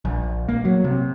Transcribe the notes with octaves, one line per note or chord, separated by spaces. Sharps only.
A#1
A#3
F#3
C3